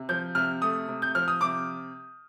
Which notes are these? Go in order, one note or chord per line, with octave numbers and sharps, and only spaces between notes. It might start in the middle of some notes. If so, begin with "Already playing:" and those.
Already playing: C3
F3 G6
C3 F6
A3 D#6
C3
G6
F3 F6
D#6
C3 D6